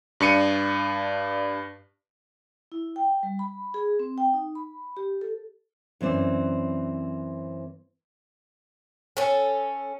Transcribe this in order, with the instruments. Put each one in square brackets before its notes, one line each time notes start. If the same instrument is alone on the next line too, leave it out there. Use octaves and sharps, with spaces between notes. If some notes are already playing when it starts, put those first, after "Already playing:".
[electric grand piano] G2 D4 C#7 D#7
[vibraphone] E4
G5
G3
B5
G#4
C4
G5
D#4
B5
G4
A4
[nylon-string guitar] F#2 E3 C4 D5
[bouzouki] C#4 A4